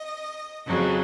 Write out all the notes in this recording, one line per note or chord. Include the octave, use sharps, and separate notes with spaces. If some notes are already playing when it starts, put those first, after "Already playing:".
Already playing: D#5
F2 C#3 F#3